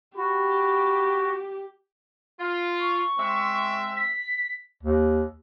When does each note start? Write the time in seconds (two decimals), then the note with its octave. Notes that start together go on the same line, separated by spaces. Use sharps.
0.17 F#4 G4 B5
2.40 F4
2.80 C#6
3.19 G#3 C4 E5
3.97 B6
4.83 D#2